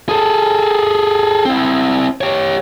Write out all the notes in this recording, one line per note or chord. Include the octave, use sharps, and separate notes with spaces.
G#4 A4
C4 E4
G4 C#5